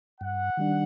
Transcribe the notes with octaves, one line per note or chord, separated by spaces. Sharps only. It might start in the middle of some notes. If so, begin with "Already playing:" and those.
G2 F#5
D#3 G3 D4